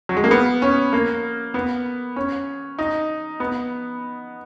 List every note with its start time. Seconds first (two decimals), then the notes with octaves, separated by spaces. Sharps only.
0.09 F#3
0.17 G#3
0.24 A#3
0.31 B3
0.62 C#4
0.93 A#3
1.54 B3
2.16 C#4
2.79 D#4
3.40 B3